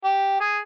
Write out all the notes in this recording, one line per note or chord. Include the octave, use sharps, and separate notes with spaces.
G4
G#4